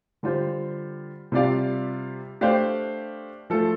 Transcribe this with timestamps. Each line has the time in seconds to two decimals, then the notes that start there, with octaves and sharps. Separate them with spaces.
0.23 D3 G3 F4 C5
1.32 C3 G3 F4 D5 F5
2.41 A3 D4 G4 C5 F5
3.50 F3 A3 F4 A4